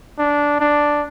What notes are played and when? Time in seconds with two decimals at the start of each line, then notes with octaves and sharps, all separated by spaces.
0.18 D4
0.60 D4